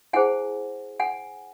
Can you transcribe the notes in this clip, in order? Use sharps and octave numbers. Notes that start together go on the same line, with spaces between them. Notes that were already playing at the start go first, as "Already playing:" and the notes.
E4 G#4 C5 F#5 G#5
F#5 G#5